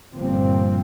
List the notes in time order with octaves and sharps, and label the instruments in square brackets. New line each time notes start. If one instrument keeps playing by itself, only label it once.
[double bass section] G1 G2 A#2 F3 C4